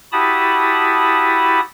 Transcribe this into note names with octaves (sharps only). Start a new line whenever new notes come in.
E4 F#4 G4 A5 B5 D#6